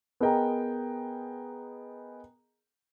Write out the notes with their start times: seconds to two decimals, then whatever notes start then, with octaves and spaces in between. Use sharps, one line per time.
0.20 B3 G#4 A#4 D#5 G5 A#5